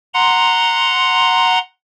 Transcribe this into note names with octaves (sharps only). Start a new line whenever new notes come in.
F#5 A#5 C6